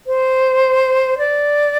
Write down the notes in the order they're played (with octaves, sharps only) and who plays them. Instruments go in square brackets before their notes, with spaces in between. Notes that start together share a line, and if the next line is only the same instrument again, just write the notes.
[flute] C5
D5